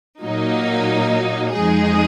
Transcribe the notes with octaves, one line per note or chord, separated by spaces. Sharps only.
A#2 F#3 A#3 D#4
F2 F3 G#3 D#4 G#4